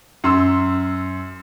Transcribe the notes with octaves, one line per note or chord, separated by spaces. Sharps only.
F#2 C6 E6